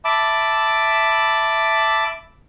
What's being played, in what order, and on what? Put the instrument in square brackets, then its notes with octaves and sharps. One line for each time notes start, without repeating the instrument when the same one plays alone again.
[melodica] E5 A5 B5 D6